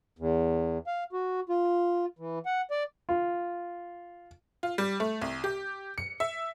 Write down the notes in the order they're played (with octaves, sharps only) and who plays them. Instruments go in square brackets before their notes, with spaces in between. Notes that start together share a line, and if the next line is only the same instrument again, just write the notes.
[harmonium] E2
F5
F#4
F4
E3
F#5
D5
[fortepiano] F4
[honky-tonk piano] F4
G3
A3
C2
G4
C#7
E5